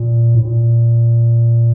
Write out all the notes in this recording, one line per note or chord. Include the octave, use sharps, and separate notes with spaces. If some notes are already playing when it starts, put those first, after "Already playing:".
Already playing: A#2
A2
A#2